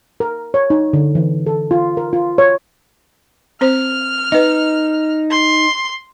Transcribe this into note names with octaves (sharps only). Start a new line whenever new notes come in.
A#4
C#5
D#4
D3
E3
A4
F4
A#4
F4
C#5
C4 C5 F6
D#4 B4 D#5
C6